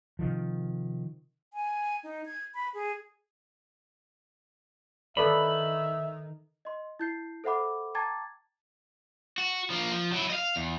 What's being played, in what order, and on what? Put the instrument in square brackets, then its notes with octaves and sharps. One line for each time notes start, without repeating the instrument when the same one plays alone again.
[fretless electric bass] C3 D#3 F3
[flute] G#5
D#4
G#6
B5
G#4
[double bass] D#3 [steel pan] A4 B4 D5 [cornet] E5 [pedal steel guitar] B5
[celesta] D#5 C6
E4 G6 C7
A4 C5 E5 F#5 B5 D6
G5 A5 A#5 D6 G#6 A6
[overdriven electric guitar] F#4
F3 A#3
F3
F#3 E4
D#5 F5
E2